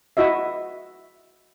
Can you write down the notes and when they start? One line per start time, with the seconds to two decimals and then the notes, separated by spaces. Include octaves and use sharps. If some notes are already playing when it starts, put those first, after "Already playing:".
0.17 E4 F#4 D#5 E5